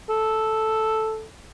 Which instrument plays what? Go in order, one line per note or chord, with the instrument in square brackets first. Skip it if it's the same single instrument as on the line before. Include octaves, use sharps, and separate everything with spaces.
[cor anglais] A4